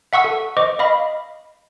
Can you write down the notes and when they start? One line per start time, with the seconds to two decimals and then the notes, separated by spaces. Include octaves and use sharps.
0.13 E5 F#5 C#6 E6
0.24 A4
0.57 C5 D#5 C#6 D6
0.79 D#5 F5 B5